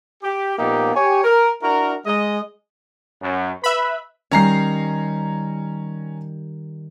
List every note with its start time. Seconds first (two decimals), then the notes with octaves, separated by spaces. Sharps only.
0.23 G4
0.58 A#2 F3 A#3 B3 D#4 G4
0.94 G4 C#5 G#5
1.24 A#4
1.62 D4 E4 F#4 A#4
2.06 G#3 D#5
3.22 F#2
3.64 B4 E5 B5
4.31 D#3 G3 C#4 A#5 C7